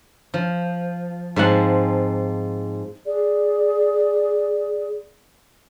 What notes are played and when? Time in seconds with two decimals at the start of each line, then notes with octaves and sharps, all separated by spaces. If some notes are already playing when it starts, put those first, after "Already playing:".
0.34 F3
1.36 G#2 F3 C4 F#5 A5
3.05 G#4 D5